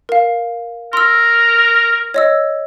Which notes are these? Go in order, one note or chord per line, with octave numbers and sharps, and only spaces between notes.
A#4 F5
A#4 C6 E6
C#5 D#5 E6